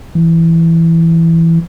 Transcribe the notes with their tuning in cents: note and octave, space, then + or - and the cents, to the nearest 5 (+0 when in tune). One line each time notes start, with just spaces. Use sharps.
E3 +5